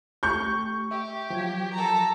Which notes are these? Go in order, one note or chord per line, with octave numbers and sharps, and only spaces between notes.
A3 G4 C#6 G6
G4 E5
F3 F#3 G#6
A4 A#5